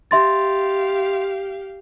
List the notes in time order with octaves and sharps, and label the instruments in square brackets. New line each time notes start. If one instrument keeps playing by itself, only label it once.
[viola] G4 F5 [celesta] E5 C6 A6